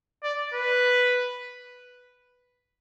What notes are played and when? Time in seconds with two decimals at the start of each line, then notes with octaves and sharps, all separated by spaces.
0.23 D5
0.54 B4